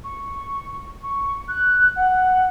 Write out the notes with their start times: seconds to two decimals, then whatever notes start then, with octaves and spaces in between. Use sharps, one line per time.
0.04 C#6
1.03 C#6
1.48 F#6
1.96 F#5